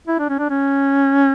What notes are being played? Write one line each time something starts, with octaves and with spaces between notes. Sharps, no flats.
E4
D4
C#4
D4
C#4